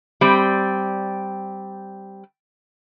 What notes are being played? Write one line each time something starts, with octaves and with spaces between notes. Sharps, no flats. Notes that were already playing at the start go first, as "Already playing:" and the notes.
G3 C4